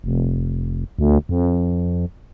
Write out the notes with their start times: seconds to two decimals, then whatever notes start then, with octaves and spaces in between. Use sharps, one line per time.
0.04 F1
0.99 D2
1.29 F2